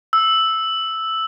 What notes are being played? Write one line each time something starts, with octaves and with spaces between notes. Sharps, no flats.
E6